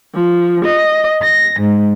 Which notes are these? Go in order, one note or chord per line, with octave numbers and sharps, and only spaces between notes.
F3
D#5
A#6
G#2